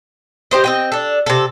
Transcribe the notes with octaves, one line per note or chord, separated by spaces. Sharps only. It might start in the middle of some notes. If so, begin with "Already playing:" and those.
G4 C5 D#5
C4 D#5 G5
D4 A4
C3 A4